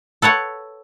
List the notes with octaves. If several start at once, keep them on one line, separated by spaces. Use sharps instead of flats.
A4 B4 C#5 F#5